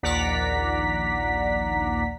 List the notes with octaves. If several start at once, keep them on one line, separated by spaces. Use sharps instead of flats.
A#1 D#2 D5 F#5 A#5 B6